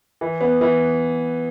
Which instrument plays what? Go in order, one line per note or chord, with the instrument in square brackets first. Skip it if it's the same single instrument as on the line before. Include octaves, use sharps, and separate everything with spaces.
[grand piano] E3
B3
E3